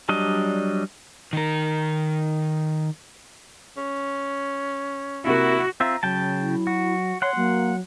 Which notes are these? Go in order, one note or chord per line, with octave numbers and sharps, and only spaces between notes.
F#3 G3 D4 D#5
D#3 A#4
C#4
C3 A#3 E4 F#4
C4 F4 E5 A#5
C#3 F#3 G5 A5
E4
F#4
C#5 F#5 C6
F#3 A#3